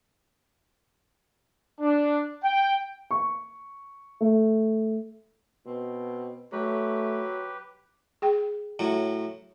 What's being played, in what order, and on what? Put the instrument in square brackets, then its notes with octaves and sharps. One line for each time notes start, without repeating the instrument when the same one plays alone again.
[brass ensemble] D4
G5
[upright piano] C#6
A3
[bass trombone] B2 [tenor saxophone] C4
[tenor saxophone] F#3 [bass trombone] A3 [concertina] G4 B4
[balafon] G#4 G5
[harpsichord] A2 F#3